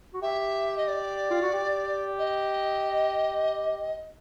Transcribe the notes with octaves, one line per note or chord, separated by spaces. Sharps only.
F#4
G4 E5
D#5
D5
F4
F#4
G4
D#5